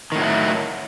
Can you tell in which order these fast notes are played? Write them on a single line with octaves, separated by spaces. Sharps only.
D#3 A2 F#3 A3